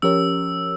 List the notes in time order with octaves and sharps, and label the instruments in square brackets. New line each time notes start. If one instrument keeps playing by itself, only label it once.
[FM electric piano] F3 C#4 G4 A#4 C#5 [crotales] E6